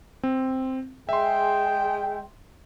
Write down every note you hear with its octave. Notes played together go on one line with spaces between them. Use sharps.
C4
G#3 G#4 E5 G5 C6